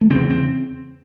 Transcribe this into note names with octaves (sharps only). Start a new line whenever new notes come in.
A3
E2 C#3 C4
C4